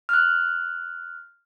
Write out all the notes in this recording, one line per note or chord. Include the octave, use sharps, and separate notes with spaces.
F6 F#6